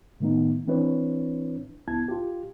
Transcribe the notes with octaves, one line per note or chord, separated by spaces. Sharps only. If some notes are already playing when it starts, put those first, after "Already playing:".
A2 D#3 A3 B3 D#4
E3 C4 D4 E4 B4 C#5
C#2 B3 E4 A5 G#6
F4 G4